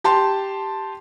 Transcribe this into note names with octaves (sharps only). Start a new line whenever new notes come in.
G4 A5 C6